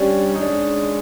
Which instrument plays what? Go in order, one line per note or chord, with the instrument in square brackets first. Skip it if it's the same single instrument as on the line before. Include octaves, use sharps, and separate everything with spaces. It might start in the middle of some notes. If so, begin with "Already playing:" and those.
Already playing: [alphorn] G3 [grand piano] C#4 D4
[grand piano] D#4
[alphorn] G#3 [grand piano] D4